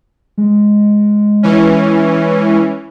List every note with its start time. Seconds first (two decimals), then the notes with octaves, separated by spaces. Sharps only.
0.38 G#3
1.43 E3 C#4